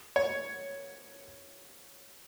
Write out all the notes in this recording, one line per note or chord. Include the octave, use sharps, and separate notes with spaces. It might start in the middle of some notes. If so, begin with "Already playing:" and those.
C#5